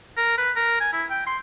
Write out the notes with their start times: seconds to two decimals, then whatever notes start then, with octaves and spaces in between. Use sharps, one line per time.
0.17 A#4
0.38 B4
0.56 A#4
0.80 G#5
0.93 E4
1.10 G5
1.27 C6